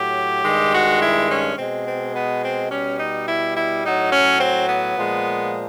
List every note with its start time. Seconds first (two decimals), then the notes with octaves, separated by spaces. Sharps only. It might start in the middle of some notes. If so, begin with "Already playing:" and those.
Already playing: A2 F#3 G4
0.45 G2 D#3 G#3
0.74 F#4
1.02 E4
1.30 C#4
1.58 B2 G#3 C4
1.86 C4
2.15 B3
2.43 C4
2.71 B2 G3 C#4
2.99 D#4
3.28 E4
3.57 E4
3.84 A2 F#3 D#4
4.13 C#4
4.41 C4
4.69 B3
4.97 A#2 F3 G#3